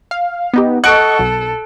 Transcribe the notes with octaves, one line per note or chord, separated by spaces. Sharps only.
F5
B3 D#4 G4
A4 D#5 F#5 C#6 F#6 D7
B1